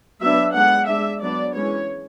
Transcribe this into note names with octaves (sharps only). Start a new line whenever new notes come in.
F#3 B3 D4 E5
G#3 B3 D4 F#5
G#3 D4 E5
F#3 B3 D4 D5
E3 G#3 C#4 C#5